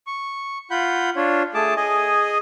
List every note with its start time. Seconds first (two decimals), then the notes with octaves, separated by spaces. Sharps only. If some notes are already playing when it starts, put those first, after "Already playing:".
0.07 C#6
0.71 F4 F#5 B5 G6
1.16 D4 F4 C#5
1.54 A3 G#4 A5 D6
1.77 G#4 D#5 G#5